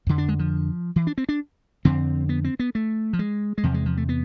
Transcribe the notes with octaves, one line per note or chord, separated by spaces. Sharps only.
F2 D3
D4
G#3
F3
E3
D4
C4
D4
F2 D3 C4
B3
C4
B3
A3
F3
G#3
G#3
E2 C3 F3
G#3
F3
A3
B3